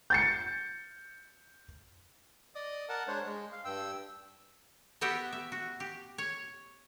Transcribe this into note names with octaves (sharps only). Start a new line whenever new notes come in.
G6 A6 C#7
D5 D#5 D#6
A#4 F#5 A5
G#3 D4 C5 C#5
G#3
F5
G2 G5 E6
B3 F#4 G4 E5 F#5 G5
E5
F#4
G4
C#5